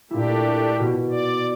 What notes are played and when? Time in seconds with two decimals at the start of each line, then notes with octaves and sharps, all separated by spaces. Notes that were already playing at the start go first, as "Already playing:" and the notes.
0.11 A#2 A3 D4 E4 G4
0.80 B2
1.09 D5